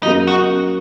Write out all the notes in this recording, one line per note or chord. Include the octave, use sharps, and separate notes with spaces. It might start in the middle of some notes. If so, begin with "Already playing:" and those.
F#2 C#3 F#3 A#3 D#4
F#4